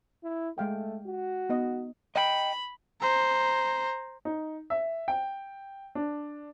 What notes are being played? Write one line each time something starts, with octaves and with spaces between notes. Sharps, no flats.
E4
G#3 A3 F5 G5
F#4
B3 D#4 D#5
D#5 G5 B5
C5 A#5
D#4
E5
G5
D4